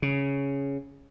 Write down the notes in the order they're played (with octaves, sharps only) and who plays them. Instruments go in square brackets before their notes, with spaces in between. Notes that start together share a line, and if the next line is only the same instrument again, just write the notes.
[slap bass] C#3